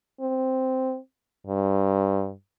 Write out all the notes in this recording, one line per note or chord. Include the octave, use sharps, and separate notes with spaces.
C4
G2